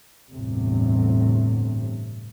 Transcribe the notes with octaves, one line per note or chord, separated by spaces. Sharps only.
G1 E2 A2 C3